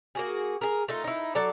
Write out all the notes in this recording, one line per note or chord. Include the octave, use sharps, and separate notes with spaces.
A#3 F#4 G#4
G#4 A#4
A3 D#4 F4
D#4 E4
F#3 A4 D5